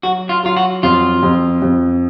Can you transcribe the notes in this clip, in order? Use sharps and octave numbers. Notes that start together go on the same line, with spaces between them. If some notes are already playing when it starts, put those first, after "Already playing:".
F#3 F#4
F4
F#3 F4
F#4
F2 F4
F2
F2